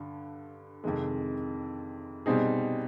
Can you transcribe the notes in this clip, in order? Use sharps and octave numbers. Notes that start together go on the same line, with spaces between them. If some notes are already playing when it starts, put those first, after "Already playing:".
Already playing: G2 D3
F2 C3 D#3 G#3
B2 G3 C4 D#4 G#4